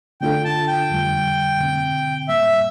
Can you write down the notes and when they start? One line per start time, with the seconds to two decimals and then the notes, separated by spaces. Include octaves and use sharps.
0.21 D3 A3 D4 F4 A4 G5
0.44 A5
0.68 G5
0.90 F2 D3 G3
1.60 D3 A3 C4
2.28 A2 G3 A#3 E5